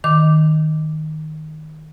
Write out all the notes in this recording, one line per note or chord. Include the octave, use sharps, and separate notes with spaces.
D#3 D6